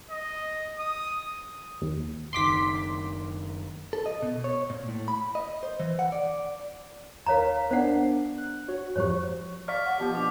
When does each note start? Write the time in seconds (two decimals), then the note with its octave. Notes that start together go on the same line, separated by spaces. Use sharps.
0.10 D#5
0.79 D#6
1.81 D#2
2.33 F#1 D#3 C6 D6 B6
3.93 A4
4.06 D#5
4.22 B2
4.44 C#5
4.70 A#2
4.88 A2
5.08 B5
5.35 D#5
5.63 C5
5.80 E3
5.99 F#5
6.12 D5
7.26 D#2 A#4 C#5 F5 A#5 B6
7.71 B3 D4 A#4 C5 D5 F#5
8.38 F#6
8.68 F#4 C#5
8.96 F2 G#2 F3 G4 C5 C#5
9.68 D5 F5 C#6 F6 B6
9.84 F#5
9.99 B2 F3 G4
10.15 D4 D6